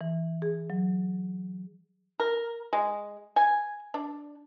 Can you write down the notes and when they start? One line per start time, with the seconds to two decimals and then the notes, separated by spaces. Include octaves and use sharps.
0.01 E3
0.42 G#4
0.70 F#3
2.20 A#4
2.73 G#3
3.36 G#5
3.94 D4